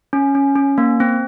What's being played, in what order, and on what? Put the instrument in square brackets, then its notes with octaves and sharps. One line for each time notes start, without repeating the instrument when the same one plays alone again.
[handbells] C#4
C#4
C#4
A#3
C4